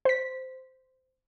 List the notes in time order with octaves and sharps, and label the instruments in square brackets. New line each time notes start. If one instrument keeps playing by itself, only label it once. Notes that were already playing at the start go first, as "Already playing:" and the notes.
[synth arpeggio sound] C5 B6